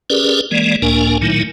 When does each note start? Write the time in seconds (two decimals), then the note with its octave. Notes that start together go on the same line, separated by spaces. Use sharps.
0.10 C#4 G4 G#4 A#4 B4 D5
0.51 E3 G#3 A#3 D5
0.82 C#2 A2 A#3 D4 A#4 G#5
1.22 A#2 D#3 F#3 A3 D#4 E4